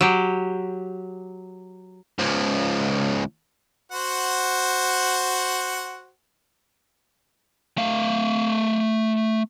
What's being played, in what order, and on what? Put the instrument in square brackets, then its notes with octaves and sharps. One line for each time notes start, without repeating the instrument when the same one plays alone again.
[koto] F#3 G4
[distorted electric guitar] C#2 F3
[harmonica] F#4 C5 F#5
[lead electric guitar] A3 F5